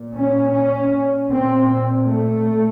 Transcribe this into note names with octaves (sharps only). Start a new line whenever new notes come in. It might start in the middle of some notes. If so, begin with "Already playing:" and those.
Already playing: A#2
C#4
C#4
A#2 C4
A3